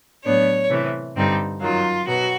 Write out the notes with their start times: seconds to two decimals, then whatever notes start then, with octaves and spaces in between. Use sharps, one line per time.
0.24 A2 F#3 B3 D4 C#5
0.70 C3 E3 A3
1.16 G2 D3 G3 C4 D#4
1.60 F#2 D#3 F#3 F4
2.06 B2 F#3 B3 F#4